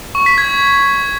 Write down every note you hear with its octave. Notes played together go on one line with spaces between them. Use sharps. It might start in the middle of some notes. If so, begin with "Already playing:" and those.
C#6
B6
G#6